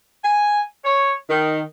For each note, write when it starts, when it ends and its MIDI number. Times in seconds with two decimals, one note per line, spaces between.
0.24 0.61 80
0.85 1.12 73
1.30 1.60 51